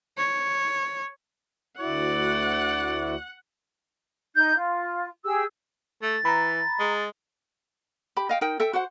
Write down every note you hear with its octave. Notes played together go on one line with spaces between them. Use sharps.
C#5
D2 E4 F#4 D5 F#5
D#4 G6
F4
G4 G#4 E6
A3 A6
E3 A#5 B5
G#3
G4 B5
D#5 F5 G5
D#4 A#4 G5
A4 E5 G5
F#4 C5 F#5